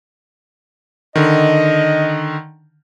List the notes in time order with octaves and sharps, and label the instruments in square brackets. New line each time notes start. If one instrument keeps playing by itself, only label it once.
[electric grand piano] D3 D#3 [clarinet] D#5